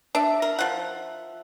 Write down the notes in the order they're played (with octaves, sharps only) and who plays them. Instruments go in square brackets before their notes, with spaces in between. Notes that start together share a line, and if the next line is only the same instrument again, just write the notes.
[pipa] D4 [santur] E5
[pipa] A#4
F3 F#5